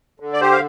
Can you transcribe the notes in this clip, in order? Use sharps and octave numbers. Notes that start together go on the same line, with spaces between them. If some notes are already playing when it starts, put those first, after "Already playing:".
D3
D5
G4 C5
F5